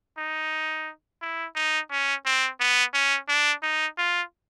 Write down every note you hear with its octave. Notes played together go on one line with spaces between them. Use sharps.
D#4
E4
D#4
C#4
C4
B3
C#4
D4
D#4
F4